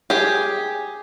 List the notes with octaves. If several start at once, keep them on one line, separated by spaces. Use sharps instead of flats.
G4 G#4